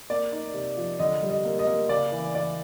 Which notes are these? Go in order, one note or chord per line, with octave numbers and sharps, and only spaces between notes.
A#3 D5
D#4
C3
F3
D3 D#5
G3
D#5
A#3
D#5
A#3
C#3 D5
E3
E3 D5